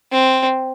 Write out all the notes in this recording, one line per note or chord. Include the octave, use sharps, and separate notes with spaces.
C4